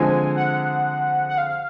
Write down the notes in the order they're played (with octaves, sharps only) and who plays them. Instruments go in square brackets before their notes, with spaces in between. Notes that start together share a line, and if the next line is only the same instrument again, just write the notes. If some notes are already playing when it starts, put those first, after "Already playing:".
Already playing: [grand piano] D3 F3 G#3 C4 [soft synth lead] G#5
[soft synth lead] F#5
F#5
F5